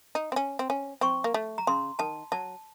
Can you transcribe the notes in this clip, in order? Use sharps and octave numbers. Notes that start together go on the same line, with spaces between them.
D#4
C4
C#4
C4
C#4
C4 C#6
A#3
A3
A#5
C#3 C6
D#3 A5
F#3 A5